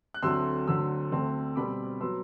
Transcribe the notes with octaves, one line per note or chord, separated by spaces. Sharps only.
F#6
D2 D3 F#3 A3 C4 C6 E6
D2 D3 F#3 C4 C6 E6
D2 D3 A3 C4
B2 G3 C4 B5 D6
F#3 B3 C6 E6